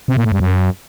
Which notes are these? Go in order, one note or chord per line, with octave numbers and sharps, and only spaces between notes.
C3
A#2
A2
G2
F#2